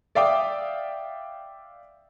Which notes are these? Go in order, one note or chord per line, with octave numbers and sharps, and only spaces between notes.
D5 E5 F5 G5 D6 D#6